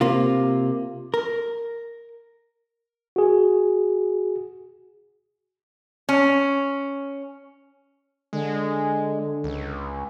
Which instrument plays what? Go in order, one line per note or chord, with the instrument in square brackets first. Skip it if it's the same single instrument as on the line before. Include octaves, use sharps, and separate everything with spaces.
[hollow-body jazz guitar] C3 A#3 F4
A#4
[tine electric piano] F#4 G#4
[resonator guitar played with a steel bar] C#4
[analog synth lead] D3 [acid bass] G#3
[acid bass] C#2